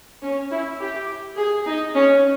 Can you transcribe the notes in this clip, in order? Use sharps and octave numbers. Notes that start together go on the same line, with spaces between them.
C#4
E4
G4
G#4
D#4
C#4